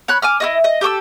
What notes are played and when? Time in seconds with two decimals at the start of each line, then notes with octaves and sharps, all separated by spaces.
0.08 C#5 B5 F#6
0.22 G#5 D6 F6
0.40 E4 F#4 D#5
0.64 D#5
0.81 G4 A4 D6 E6